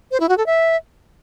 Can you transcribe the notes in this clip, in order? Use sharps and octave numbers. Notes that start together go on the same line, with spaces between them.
C5
E4
F#4
A4
E5